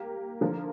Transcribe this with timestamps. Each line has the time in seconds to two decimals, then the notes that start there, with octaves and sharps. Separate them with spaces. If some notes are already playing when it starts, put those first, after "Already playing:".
Already playing: A#3 G4
0.41 D3 F3 A#3